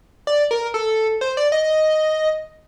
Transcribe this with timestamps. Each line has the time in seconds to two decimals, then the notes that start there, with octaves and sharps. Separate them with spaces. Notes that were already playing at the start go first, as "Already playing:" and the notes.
0.27 D5
0.51 A#4
0.74 A4
1.21 C5
1.37 D5
1.52 D#5